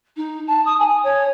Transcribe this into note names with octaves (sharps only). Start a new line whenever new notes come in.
D#4
A5
D#6
G#5
C#5